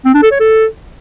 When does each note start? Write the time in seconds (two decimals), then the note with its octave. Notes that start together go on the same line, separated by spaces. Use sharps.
0.05 C4
0.14 D4
0.23 A4
0.31 C#5
0.40 A4